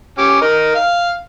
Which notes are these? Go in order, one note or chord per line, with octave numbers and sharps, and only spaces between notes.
C#4 G4
D#4 A#4
F5